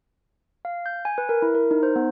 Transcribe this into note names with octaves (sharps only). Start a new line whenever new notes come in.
F5
G6
G#5
B4
A#4
E4
A#4
D#4
C5
B3